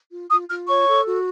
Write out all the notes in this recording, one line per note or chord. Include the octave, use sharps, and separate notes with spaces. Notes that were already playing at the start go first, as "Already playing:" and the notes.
F4
F4 D#6
F4 F6
C#5 C#6
A4
F#4